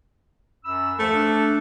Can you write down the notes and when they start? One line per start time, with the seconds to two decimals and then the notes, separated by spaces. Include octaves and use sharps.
0.64 F#2 B5 E6
0.99 D#2 D#3 F3 A3
1.13 D4